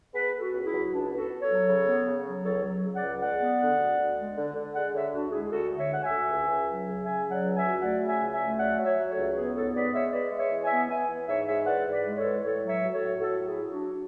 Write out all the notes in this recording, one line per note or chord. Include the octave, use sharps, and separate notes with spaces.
B3 G#4 B4
B3
F#4 A4
C#2
E4 G#4
F#3
C#2 D4
B3
F#4 A4
B3
A4 C#5
F#3
C#3
B3
C#3
F#3
C#2 A4 C#5
F#3
C#3
D5 F#5
C#2
G#3 D5 F#5
B3
D3
D2
D2
G#3
D3
D3
G#3 D5 F#5
D3 C#5 E5
D2 D4 F#4
G#3 E4 G#4
G#4
D2 F#4 A4
D3
C#5 E5
D2 F#5
E5 G#5
D2
C#2
C#2
F#3
C#3
C#3 E5 G#5
F#3
D5 F#5
C#2
E5 G#5
F#3
A3 D5 F#5
C#3
E5 G#5
C#2
E5 G#5
A3
F#3 D5 F#5
F#3
C#5 E5
F#3
A4 C#5
C#2
B3 G#4 B4
G#2 A4 C#5
B3 B4 D5
G#3 C#5 E5
B3 B4 D5
G#3
C#5 E5
E3
E5 G#5
B3
B3 E5 G#5
E3
G#2 C#5 E5
G#3 C#5 E5
E3 D5 F#5
G#2
B4 D5
G#3
A4 C#5
E3
A2 A4 C#5
F#3
C#5 E5
F#3
A4 C#5
A2
A2 F#4 A4
F#3
E4 G#4
F#3
D4 F#4
F#3